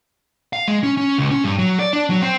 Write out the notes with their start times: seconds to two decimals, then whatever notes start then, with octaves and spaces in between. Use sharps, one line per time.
0.53 F5
0.68 G#3
0.83 C#4
0.97 C#4
1.18 C#2
1.31 C#4
1.44 G2
1.58 F#3
1.79 D5
1.93 D4
2.10 F#3
2.22 C4